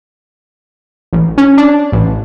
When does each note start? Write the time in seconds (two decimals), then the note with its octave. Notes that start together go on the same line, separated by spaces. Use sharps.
1.13 A1
1.37 C#4
1.57 D4
1.92 A1